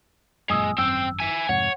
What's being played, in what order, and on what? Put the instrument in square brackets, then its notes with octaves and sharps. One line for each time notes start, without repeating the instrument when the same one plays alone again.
[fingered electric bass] G1 F#2 A#2 [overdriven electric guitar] G#3 [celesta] G#5 D#6 E6
[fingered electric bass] G#1 F#2 [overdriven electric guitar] C4 G5 [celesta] E6
[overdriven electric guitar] E5 G#5
[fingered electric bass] F2 G#2 C3 [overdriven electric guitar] C#5 [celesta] F#5